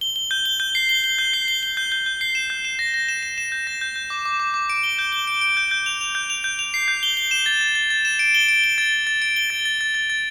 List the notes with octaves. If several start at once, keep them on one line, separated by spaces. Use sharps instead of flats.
G7
G7
G6
G7
G6
C7
G7
G7
G6
C7
G7
G7
G6
G6
G6
C7
E7
G6
E7
A#6
A#6
E7
E7
E7
G6
A#6
G6
G6
D6
D6
D6
D6
D7
G7
G6
G7
D7
D7
G6
G6
F7
F7
G6
F7
G6
F7
C7
G6
G7
G7
E7
A6
A6
A6
A6
E7
D7
G7
D7
G7
A6
A6
A6
D7
G7
A6
A6
A6
A6
A6